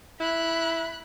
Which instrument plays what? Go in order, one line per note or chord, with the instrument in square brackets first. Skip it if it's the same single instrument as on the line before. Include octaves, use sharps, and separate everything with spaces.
[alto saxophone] E4 [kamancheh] B5 F#6